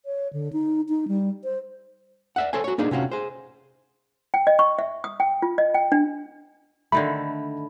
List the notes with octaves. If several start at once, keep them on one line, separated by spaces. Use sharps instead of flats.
C#5
D3
D#4
D#4
G3
C5
D5 E5 F#5
A4 C5 C#5 G#5
F#4 C#5
A#3 D4 D#4 G#4
C3 C#4 F4 F#4
G#4 C5
G5
D#5
C#6
E5
D#6
G5
F4
D#5
G5
D4
D3 D#3 A3 B5